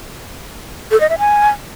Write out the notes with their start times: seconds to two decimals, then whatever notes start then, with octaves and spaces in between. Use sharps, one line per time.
0.91 A4
1.00 D#5
1.10 E5
1.19 G#5